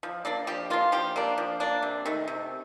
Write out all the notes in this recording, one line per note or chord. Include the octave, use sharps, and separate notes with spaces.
F3
A#3 D4 D5
F3 G4
A#3 D4 F4
F3 G4
A#3 D4
F3
A#3 D4
C3
D#3 A3
C3